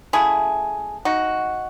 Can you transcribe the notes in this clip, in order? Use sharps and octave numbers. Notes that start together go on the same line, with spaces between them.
C#3 F#3 A3 E4 G#4
D#4 F#4